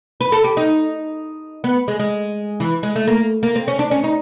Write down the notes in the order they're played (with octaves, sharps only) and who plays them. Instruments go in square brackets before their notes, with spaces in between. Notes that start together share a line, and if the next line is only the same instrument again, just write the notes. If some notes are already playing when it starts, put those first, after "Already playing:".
[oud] B4
A4
G4
D#4
B3
G#3
G#3
E3
G#3
A3
A#3
A#3
C4
C#4
D4
C#4
D#4